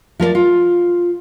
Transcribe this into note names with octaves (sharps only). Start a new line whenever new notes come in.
F3 A#4 B4 D5
F4